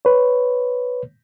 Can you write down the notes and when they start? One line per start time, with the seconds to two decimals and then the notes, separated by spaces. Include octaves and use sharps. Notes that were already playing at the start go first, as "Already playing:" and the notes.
0.05 B4 C#5